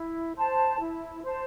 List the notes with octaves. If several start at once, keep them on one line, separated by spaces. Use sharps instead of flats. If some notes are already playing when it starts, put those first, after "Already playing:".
Already playing: E4
C5 A5
E4
C5 A5